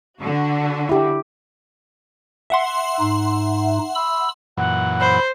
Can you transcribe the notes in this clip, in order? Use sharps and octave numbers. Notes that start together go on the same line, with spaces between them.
D3 F#4
E4 G4
E5 F#5 C6
G#2 D#4
B5 E6
F#2 A#2 E3 F#5
C5 B5